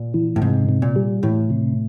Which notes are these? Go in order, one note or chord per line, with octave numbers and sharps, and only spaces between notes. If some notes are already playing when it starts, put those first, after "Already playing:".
Already playing: A#2
E3
A2
G#2 C3
C3
A#2
G3
A2 E3
C3